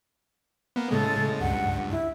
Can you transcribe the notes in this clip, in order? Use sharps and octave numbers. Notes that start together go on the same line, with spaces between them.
A#3 B3
A2 C#3 G#3 A4
C#2 G2 F#5
E4